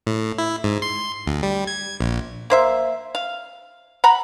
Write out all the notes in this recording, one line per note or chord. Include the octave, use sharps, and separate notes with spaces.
A2
E4
G#2
C6
D2
G3
G#6
A#1
A#3 C5 E5
F5
F#5 A#5 B5